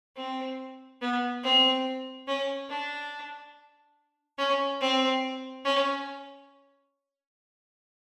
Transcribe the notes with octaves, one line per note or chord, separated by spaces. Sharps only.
C4
B3
C4
C#4
D4
C#4
C4
C#4